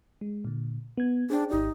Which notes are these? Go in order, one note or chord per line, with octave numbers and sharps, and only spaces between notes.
G#3
A#2 D3
B3 G#6
D4 G#4 C5 G5
G#1 D#4 G4 D5